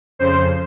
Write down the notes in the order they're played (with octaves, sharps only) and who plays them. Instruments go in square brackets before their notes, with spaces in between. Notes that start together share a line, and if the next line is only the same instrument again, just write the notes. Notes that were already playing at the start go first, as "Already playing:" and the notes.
[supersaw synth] F2 C#3 C5